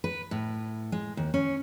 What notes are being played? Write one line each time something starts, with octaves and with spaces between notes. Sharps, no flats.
B4
A2
G#3
D#2
C#4